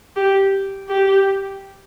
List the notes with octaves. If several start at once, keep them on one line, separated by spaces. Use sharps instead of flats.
G4
G4